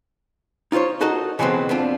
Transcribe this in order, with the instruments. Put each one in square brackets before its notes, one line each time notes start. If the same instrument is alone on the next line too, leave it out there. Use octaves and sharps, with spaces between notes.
[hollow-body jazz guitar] D#4 F4 A4 C5 C#5
D#4 F#4 A4 A#4 D#5
B2 E3 F#3 G#3 B3 C4
F2 B3 C4 D4 F4